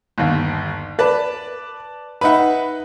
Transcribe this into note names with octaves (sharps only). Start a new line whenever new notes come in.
G1 D#2
B4 D5 A5
D#4 B4 E5 F#5 B5